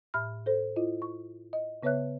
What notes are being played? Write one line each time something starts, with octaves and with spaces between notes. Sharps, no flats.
A2 E5 B5 F6
A4 C5
E4 F4 D#5
C#6
D#5
C#3 B3 B4 C#5 E5 F#6